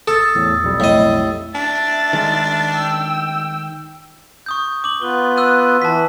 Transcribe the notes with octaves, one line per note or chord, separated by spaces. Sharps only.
A4 D#6 E6 A6
E2 A2
B1 F2 G3
A2 D#5
D4 E5 A6
D#3 G#3
G5 E6
C#6 D#6 G6
D6 F#7
B3 F4 B4 G7
E6 F#6 D#7
E3 A5 B6